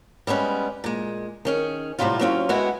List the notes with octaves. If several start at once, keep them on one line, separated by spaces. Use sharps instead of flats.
G3 G#3 B3 C#4
A#2 G#3
D#3 C#4 G#4
A2 C3 D#3 F#3 G3 F4
F#3 G3 C4 C#4 F4
G#3 B3 C4 E4 F#4